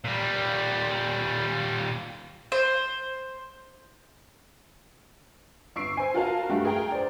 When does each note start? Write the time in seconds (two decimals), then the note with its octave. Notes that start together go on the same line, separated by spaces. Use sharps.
0.04 A#2 G3
2.52 C5
5.76 G1 C#6 E6 C7 D7
5.97 C5 G#5
6.14 F4 F#4 A#4 F5 A5
6.49 G2 A3 F#4 G4
6.65 G#4 A#4 G5 A#5
6.92 C5 D5